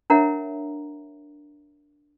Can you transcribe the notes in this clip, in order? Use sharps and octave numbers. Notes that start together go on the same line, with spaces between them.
D4 A#4 C#5 E5 F#5 A#5